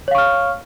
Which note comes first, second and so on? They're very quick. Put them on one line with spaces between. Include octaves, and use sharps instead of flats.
C#5 F5 C#6 F6